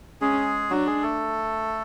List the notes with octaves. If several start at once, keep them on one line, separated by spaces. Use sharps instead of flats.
G#3 C#4 G#4
F#3 D4 F#4
G#3 G#4
A3 A4